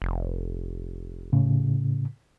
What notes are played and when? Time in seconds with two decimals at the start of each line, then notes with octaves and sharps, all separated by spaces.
0.02 F1
1.33 A2 C#3